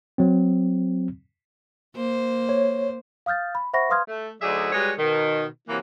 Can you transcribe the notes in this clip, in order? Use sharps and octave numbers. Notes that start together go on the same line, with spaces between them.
F#3 C4
A#3 C5
C#5
F5 D#6 F6 G6 A6
B5
C5 E5 F#5 B5 C#6 A#6
B4 F5 C6 D#6 F6 G#6
A3
D2 F#3 D#4 G#4 D5 E5
G3 G#3 F#4 G#4 B4 C#5
B2 D#3
C3 E3 F#3 A#3